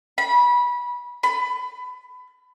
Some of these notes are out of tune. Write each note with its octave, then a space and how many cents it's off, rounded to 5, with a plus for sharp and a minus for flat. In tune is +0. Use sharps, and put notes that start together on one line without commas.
B5 -20
B5 +25